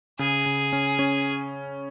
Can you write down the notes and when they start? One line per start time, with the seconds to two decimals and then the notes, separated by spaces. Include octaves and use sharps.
0.19 C#3 G#4
0.46 C#3
0.73 C#4
0.99 C#4